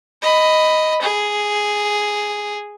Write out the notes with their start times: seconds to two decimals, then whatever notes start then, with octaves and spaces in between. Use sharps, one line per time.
0.22 D#5 B5
1.02 G#4